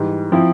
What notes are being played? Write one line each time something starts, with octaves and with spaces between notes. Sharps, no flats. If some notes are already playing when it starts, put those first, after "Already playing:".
Already playing: G#2 E3 G3
F3 C4 E4